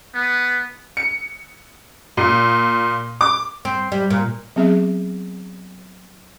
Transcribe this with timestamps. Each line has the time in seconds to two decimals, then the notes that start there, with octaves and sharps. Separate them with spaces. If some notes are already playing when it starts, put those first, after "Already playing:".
0.14 B3
0.97 C#7
2.17 A#2
3.21 D6
3.65 C4
3.92 G3
4.10 A#2
4.56 F#3 B3 C4 G#4 E5